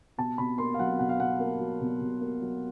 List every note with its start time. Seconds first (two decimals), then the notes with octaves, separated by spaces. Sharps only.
0.18 B2 A5
0.38 B2 B5
0.58 A#3 C6
0.74 F5
0.79 F#3 F#5
0.99 B2 F#5
1.09 F5
1.20 B2 F#5
1.40 A#3
1.60 F#3
1.81 B2
2.01 B2
2.21 A#3
2.42 F#3